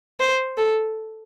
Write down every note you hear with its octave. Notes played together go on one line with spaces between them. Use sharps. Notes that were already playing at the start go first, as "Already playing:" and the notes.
C5
A4